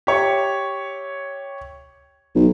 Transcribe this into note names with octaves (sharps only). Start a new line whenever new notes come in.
G4 C#5 E5
B1